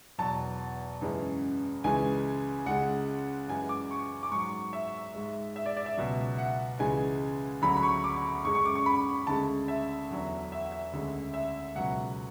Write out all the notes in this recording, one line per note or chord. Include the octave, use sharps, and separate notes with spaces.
E2 B2 F#3 A5
F#2 C#3 E3 G#3
C#2 C#3 E3 G#3 G#5
C#2 C#3 G#3 F#5
F#2 E3 G#3 G#5
D6
C#6
D6
G#2 F#3 C#6
E5
G#2 G#3
E5
D5
D5
E5
C#2 B2 F#3
F#5
C#2 C#3 E3 G#3 G#5
D2 C#3 F#3 B5
B5
C#6
D6
F#2 C#3 G#3 C#6
C#6
D6
C#6
B5
D2 C#3 G#3 A5
E5
E2 D3 F#3
E5
E5
D2 C#3 G#3
E5
C#2 B2 F#3 F#5